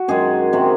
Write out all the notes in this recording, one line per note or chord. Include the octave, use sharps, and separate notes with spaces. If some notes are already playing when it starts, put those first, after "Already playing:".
Already playing: F#4
F#2 D#3 G#3 G#4
C3 D#3 G#3